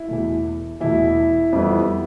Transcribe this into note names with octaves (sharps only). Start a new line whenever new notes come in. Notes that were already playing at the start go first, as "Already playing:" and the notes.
Already playing: E4
E2 B2 A3
E2 B2 A3 E4
F2 E3 G3 B3